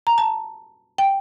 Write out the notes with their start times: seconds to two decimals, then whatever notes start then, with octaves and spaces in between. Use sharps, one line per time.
0.07 A#5
0.18 A5
0.98 G5